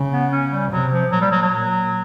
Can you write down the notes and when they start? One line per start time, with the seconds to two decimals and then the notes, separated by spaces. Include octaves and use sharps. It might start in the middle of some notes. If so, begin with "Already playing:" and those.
Already playing: C#3
0.12 B3
0.32 C#4
0.52 G3
0.72 C3 F#3
0.92 F3
1.11 A#2 F#3
1.21 G3
1.31 F#3
1.42 F#3
1.52 A#2